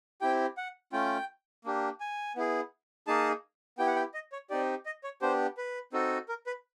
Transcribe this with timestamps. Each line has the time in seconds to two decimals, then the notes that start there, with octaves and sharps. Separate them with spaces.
0.21 C4 E4 G4 G5
0.57 F#5
0.92 A3 C#4 F4 G5
1.64 A#3 D4 G4
2.00 G#5
2.36 B3 E4 G#4
3.07 A#3 D#4 G#4 A5
3.78 B3 E4 G4 G5
3.87 F#5
3.96 G5
4.14 D#5
4.32 C#5
4.50 C4 D#4 G4 D5
4.86 D#5
5.04 C#5
5.22 B3 D4 G4 C5
5.57 B4
5.93 C4 D#4 F#4 A4
6.28 A#4
6.46 B4